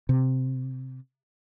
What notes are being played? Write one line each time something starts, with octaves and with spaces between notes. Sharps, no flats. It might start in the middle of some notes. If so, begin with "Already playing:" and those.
C3